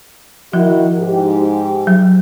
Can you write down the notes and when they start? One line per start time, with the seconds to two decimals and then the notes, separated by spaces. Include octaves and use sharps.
0.53 D#3 F3 E4 F#4
0.99 G#2 G4
1.87 F#3